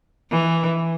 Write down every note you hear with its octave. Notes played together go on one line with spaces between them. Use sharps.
E3